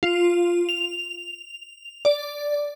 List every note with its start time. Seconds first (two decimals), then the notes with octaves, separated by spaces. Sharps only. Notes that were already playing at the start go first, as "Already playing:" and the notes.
0.03 F4
0.69 F7
2.05 D5